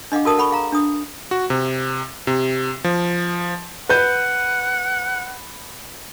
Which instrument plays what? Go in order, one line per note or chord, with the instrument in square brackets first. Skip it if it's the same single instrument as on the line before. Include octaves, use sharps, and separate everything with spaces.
[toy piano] D4 D#5 F5 F#5 D6
F#4 A4 A#4 A5 D#6
A4 F#5 B5 C#6
G#4 F5 A#5
D4 D#6
[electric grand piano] F#4
C3
C3
F3
[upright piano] B4 G6 [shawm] F#5